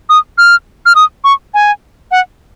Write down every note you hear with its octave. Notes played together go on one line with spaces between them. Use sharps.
D#6
F6
F6
D#6
C#6
G#5
F#5